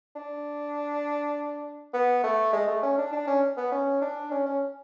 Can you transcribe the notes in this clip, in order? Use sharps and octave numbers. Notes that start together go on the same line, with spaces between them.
D4
B3
A3
G#3
A3
C#4
D4
D4
C#4
B3
C#4
D4
C#4
C#4